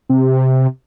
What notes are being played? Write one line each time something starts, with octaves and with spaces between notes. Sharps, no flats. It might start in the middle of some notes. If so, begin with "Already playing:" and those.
C3